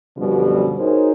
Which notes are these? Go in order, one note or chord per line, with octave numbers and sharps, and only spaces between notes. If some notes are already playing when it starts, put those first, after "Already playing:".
F#2 B2 D3 F3 G3
D#4 F#4 G#4 A#4 C5 C#5